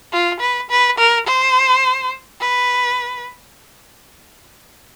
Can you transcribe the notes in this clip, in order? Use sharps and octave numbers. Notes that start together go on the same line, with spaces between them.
F4
B4
B4
A#4
C5
B4